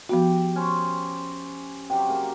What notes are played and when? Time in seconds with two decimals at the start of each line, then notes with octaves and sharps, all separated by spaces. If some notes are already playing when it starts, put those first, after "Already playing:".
0.09 F3 B3 F#4 G4
0.56 C#4 C5
1.90 C3 F#3 G4 G5
2.08 C#3 A#3